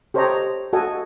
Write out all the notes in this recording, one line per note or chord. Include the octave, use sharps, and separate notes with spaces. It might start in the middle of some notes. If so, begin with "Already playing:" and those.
G4 A4 C5 C#5 D#5 A#5
F#4 A4 D#5 F#5 G#5